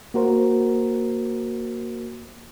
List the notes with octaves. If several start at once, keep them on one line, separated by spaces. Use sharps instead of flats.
A#3 F#4 A#4 C5